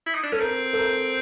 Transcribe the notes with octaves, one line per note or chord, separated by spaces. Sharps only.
E4
D#4
D4
C#4 A4
C4 A#4
A4
A#4